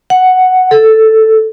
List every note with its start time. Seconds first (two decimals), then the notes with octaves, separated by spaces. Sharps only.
0.10 F#5
0.71 A4